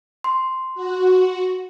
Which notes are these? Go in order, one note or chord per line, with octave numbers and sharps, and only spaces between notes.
C6
F#4